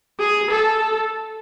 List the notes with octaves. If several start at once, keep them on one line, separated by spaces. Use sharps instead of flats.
G#4
A4